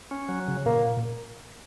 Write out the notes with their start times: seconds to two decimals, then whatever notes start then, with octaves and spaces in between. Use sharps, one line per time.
0.11 C#4
0.29 F#3
0.48 C#3
0.66 A#2 A#3